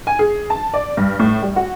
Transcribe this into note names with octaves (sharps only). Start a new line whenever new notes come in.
G#5
G#4
A5
D5
G2
A2
G3
F#4